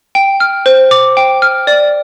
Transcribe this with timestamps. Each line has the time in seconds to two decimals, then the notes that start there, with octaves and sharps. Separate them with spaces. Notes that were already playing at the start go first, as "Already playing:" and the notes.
0.15 G5
0.40 F6
0.66 C5
0.91 D6
1.17 G5
1.42 F6
1.67 D5